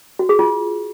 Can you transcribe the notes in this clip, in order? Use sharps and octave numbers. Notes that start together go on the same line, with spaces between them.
F#4
G#4
F4